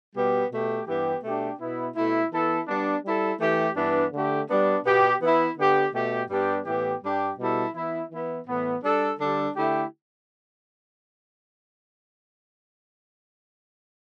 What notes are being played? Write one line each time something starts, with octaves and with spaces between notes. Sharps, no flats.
B2 G3 B3 G4
B2 A3 G4
G2 E3 B3 G4
B2 A3 D4 G4
B2 B3 E4
B2 A3 E4
E3 B3 E4 A4
G3 B3 D4
G3 E4 A4
E3 A3 G4
G2 E3 B3 D4
D3 A3 G4
G3 B3 D4
B2 B3 G4
E3 B3 E4
D3 B3 G4
B2 A3 G4
G2 G3 B3 D4 G4
A2 E3 B3 G4
G2 G3 D4 G4
B2 G3 E4 A4
E3 B3 E4
E3 B3 E4
A2 E3 B3
G3 D4 A4
D3 G3 D4 A4
D3 A3 E4 G4